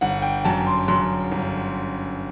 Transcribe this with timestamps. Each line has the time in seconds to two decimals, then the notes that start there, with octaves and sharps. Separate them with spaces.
0.01 G1 F#5
0.22 G5
0.45 F#2 A5
0.67 C6
0.88 F#2 C6
1.31 G1